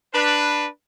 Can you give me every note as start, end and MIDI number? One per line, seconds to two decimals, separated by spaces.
0.14 0.66 62
0.14 0.66 71